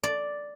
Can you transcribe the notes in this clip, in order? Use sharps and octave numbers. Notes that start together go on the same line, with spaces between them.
D5